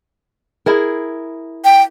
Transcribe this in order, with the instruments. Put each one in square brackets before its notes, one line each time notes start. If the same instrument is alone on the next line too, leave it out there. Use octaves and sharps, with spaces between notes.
[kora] E4 G#4 A#4
[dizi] G5